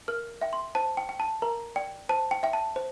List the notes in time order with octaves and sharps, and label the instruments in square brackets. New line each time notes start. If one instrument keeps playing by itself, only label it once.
[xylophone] A#4 F6
E5 G5
C6
C5 A5
G5
G5
A5
A#4 A#5
D5 G5
C5 A5
G5
E5 G5
A5
C5